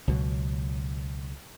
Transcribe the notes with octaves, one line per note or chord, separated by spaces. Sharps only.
C#2 B2 F#3